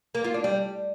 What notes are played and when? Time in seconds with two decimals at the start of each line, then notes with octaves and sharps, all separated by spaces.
0.15 A#3
0.24 F4
0.34 D4
0.44 G3